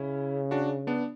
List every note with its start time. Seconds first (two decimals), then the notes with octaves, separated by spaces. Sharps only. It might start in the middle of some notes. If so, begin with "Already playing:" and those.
Already playing: C#3 C#4 E4
0.51 D4 F#4
0.87 B3 D4